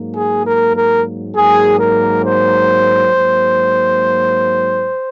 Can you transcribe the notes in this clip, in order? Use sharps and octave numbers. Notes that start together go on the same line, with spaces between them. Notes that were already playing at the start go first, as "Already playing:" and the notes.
Already playing: G#2 F#3 A#3
G#4
A#4
A#4
G#2 F#3 A#3 G#4
A#4
C5
G#2 F#3 A#3